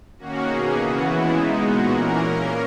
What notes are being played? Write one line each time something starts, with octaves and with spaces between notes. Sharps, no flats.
D#3 A#3 C#4 F#4
B2 A#3 C#4 G#4
C#3 E3 B3 F#4
C#3 E3 G#3 B3 E4
B2 G#3 B3 D#4
A#2 G#3 B3 F#4
E3 A#3 C#4 A#4
A#2 A#3 C#4